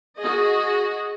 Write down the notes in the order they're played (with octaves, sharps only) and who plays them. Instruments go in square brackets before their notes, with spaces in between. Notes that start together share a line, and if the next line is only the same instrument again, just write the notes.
[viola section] F#4 G#4 D#5